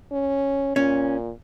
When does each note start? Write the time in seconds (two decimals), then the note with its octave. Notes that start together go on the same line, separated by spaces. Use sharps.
0.11 C#4
0.76 A#2 C#4